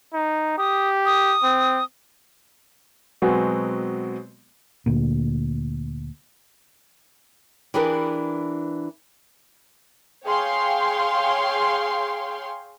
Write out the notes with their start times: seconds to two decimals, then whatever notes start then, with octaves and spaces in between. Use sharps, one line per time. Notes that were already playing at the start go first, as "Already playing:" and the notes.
0.14 D#4
0.58 G4 D#6
1.06 D#6
1.44 C4
3.22 B2 F#3 G#3 B3 C4
4.86 D2 A#2
7.74 E3 D4 G4 G#4 A#4 B4
10.26 G#4 C#5 F5 G5 C6